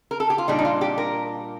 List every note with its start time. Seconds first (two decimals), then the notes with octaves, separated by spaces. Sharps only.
0.11 A#4
0.20 A4
0.30 G4
0.38 F4
0.48 A#2 G3 D4 D#4
0.59 D#4
0.65 F4
0.81 G4
0.98 A#4